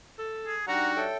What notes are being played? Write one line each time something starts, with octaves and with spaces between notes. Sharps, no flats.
A4
G#4
G3 D4 D#4 F#4 F#5 G5 A#5
A4 C#5 E5 G5